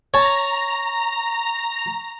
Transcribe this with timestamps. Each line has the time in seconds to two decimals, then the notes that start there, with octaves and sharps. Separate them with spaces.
0.14 C#5 A5 A#5 C#6